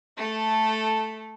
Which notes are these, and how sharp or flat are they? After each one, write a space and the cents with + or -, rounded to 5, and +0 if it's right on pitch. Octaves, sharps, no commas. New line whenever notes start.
A3 -5 A4 +0